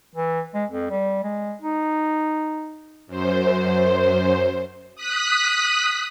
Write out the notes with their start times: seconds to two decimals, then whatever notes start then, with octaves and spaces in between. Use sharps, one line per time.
0.15 E3
0.54 G#3
0.70 F2
0.90 G3
1.23 G#3
1.62 D#4
3.07 F#2 C5
4.96 D#6 F#6 B6